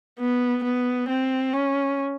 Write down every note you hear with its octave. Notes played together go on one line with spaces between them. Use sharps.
B3
B3
C4
C#4